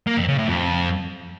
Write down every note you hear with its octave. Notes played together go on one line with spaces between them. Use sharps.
A#3
F2
C#3
A2
F2